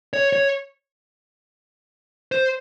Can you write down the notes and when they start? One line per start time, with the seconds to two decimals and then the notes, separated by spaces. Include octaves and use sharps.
0.13 C#5
0.33 C#5
2.32 C5